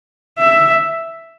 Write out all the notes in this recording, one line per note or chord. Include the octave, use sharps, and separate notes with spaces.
E5